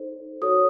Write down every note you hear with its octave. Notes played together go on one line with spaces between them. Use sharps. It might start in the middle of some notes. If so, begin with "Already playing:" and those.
Already playing: D#4 A4 C5
F#4 A4 C#5 D#6